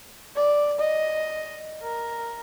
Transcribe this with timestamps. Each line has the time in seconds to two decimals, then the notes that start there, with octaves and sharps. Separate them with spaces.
0.36 D5
0.79 D#5
1.82 A#4